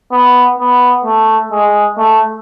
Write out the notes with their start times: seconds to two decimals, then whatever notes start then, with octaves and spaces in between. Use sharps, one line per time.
0.12 B3
0.59 B3
1.04 A3
1.52 G#3
1.97 A3